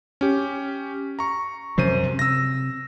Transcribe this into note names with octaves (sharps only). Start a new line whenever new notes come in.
C#4 G4
A#5 C#6
F#2 C3 F3 G3 C5 D#7
C3
E6 A#6